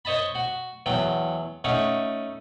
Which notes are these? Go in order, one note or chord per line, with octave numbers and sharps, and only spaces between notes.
C5 C#5 D#5 A5 B5
F#4
E2 F#3 G5
A3 C#4 D#4 C#5 F#5